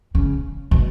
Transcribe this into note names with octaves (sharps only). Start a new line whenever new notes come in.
C#3
B2